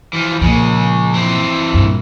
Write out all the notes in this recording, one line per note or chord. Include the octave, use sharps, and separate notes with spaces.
E3 F3
A#2 C#3 F3 G#3
E3 C4
G2 A#2